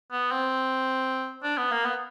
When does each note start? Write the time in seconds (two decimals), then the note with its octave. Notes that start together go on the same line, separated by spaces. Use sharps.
0.12 B3
0.31 C4
1.43 D4
1.57 B3
1.72 A#3
1.85 B3